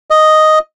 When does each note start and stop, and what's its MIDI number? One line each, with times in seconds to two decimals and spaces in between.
0.10 0.59 75